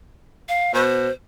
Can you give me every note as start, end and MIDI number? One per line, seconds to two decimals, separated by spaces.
0.49 0.74 77
0.74 1.08 47
0.74 1.11 72